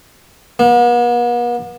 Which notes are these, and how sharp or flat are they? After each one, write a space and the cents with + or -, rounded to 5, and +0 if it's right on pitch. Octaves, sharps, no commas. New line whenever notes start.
B3 -45